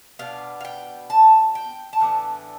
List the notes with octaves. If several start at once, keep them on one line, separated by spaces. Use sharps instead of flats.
B2 B3 D4 F5
F5
G5
A5
G5
A5
A2 E3 B3 D4